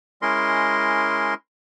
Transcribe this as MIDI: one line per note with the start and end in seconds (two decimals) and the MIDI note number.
0.22 1.34 56
0.22 1.34 61
0.22 1.34 64
0.22 1.34 70
0.22 1.34 75
0.22 1.34 84